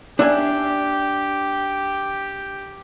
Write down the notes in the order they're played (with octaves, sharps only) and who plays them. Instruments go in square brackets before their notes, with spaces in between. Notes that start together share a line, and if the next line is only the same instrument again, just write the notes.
[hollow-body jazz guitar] D4 E5 G#5 [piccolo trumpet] G4